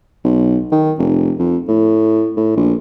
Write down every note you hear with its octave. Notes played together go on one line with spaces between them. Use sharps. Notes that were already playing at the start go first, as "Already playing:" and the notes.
B1
D#3
F1
F2
A2
A2
A#1